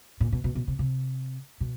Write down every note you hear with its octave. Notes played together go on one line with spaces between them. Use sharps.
A#2
B2
B2
B2
C3
C3
B2